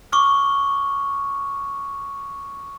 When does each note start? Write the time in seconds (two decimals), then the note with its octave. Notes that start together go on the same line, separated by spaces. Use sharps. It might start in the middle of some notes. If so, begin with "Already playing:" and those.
0.12 C#6 D6 F6